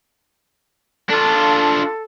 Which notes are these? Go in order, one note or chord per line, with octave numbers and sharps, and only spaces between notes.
D4 F4 A4